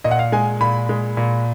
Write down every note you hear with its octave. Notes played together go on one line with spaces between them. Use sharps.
A#2 D#5
F#5
F5
G#3 G#5
A#2 B5
G#3
A#2